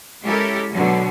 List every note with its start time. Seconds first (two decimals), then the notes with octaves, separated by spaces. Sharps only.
0.23 G#3 C#4 E4 G4 A4 A#4
0.71 B2 D3 F#3